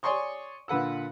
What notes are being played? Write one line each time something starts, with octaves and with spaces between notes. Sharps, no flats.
C#5 D5 G#5 C6 C#6 D#6
A#2 D3 B4 F#5 E6